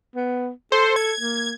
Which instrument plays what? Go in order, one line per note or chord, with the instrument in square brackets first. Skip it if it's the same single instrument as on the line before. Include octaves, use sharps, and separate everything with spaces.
[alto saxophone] B3
[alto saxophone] A4 [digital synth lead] C5
[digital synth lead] G#6
[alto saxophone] A#3